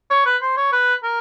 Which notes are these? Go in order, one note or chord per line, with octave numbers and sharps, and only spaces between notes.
C#5
B4
C5
C#5
B4
A#4